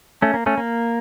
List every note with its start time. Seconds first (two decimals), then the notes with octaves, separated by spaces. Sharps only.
0.22 A3 C#4
0.34 A#3
0.46 A3 C#4
0.58 A#3